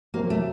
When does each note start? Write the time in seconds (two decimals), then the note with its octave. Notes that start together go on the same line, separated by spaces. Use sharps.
0.14 C3 F#3 A#3 C4 F#4 A#4
0.30 A3